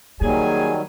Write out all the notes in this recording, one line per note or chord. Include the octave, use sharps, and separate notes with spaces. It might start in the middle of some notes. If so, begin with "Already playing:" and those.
D#3 F#3 G3 A#3 G#4 G#5